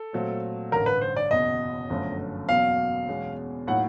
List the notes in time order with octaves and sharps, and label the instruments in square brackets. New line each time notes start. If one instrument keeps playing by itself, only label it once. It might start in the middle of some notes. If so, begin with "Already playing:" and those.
Already playing: [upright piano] A4
[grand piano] A#2 F#3 A3 C4
[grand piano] A1 G2 D3 [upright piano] A#4
[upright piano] B4
C5
D5
[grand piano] F#1 E2 B2 [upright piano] D#5
[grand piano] G1 F#2 D3 F3 A3
[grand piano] E2 B2 F#3 A#3 C#4 [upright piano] F5
[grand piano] E2 B2 G#3 C#4
[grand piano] A2 F#3 A#3 D#4 [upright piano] F#5